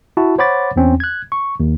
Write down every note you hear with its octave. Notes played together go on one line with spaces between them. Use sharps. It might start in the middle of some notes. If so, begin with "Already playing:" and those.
E4 F#4 A5
C5 C#5 F#5 B5 D6 A6
E2 C4 C#4
F#6 G#6
C#6
D#2